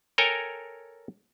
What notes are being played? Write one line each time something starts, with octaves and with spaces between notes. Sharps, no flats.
A4 A#4 C#5 G5 G#5 A#5